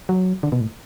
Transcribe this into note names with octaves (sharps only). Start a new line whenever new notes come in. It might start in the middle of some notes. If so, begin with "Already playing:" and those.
F#3
D3
B2
A2